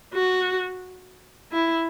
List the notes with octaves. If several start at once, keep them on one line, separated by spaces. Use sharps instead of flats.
F#4
E4